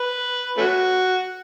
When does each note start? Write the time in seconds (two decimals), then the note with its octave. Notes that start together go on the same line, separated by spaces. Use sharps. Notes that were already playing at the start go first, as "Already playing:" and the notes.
Already playing: B4
0.57 A3 C#4 F#4